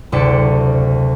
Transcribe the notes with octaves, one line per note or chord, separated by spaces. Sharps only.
F#1 D2 C3 A4 D5 C#7